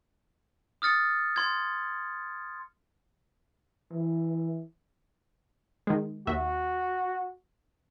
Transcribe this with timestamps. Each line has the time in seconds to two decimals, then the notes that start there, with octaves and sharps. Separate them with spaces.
0.82 D#6 F6 A6 C#7
1.36 C6 G#6
3.93 E3
5.87 D#3 G#3
6.27 D#2 F#4 E5